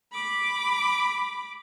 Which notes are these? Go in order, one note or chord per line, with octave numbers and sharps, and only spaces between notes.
B5 D6